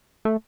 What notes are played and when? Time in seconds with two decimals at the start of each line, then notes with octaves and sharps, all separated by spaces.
0.25 A3